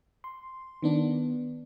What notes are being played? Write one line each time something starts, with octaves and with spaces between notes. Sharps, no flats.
C6
D#3 B3 D4